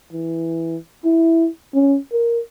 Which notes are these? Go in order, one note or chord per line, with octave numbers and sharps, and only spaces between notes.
E3
E4
C#4
A#4